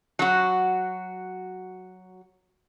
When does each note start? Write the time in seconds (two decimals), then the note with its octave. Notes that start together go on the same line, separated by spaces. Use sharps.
0.19 F#3 F#4